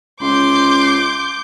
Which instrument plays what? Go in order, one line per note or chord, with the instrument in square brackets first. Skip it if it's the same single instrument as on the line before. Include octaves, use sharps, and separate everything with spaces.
[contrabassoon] C#2 [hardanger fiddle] C6 [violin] D6 G6